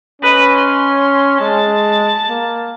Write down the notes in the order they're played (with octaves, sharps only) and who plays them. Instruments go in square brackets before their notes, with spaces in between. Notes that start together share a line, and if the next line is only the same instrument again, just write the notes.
[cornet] C#4 [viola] B4 D#5
[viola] C6
[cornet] G#3 [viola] A5
[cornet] A#3